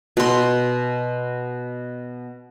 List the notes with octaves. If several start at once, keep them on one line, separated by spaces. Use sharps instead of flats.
B2 C6